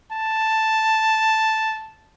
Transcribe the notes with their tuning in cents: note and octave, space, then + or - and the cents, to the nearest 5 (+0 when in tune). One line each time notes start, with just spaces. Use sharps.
A5 +0